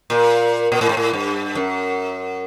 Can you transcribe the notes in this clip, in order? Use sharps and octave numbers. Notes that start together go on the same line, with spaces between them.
A#2
A#2
A2
G#2
A2
G2
F#2